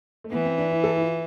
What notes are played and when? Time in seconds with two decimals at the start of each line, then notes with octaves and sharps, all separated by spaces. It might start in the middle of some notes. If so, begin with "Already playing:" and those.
0.24 A3
0.32 E3 B3
0.45 C4
0.58 D4
0.72 E4
0.84 A4
0.97 E4
1.02 F4